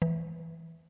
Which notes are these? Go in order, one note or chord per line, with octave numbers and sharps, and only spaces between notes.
E3